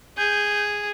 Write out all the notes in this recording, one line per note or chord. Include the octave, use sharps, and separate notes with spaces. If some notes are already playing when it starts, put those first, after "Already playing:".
G#4 G6